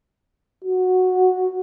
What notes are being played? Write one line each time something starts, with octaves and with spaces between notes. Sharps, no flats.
F#4